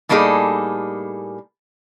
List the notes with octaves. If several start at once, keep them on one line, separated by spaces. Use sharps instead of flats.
A2 G3 A#3 D#4 G#4 A4